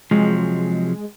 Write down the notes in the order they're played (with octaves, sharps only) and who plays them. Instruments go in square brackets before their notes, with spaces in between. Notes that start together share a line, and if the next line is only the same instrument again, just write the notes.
[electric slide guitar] C3 F3 F#3 [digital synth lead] G#3